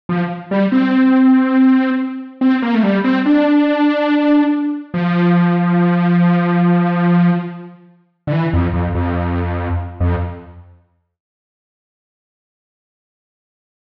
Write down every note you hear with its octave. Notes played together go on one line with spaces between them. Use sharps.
F3
G3
C4
C4
A#3
A3
G3
C4
D4
F3
D3
E3
F2
F2
F2
F2